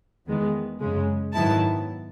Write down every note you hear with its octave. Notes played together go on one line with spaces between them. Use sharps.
E2 D#3 G#3 B3
F#2 C#3 G#3
G#2 D#3 F#3 B3 E4 A5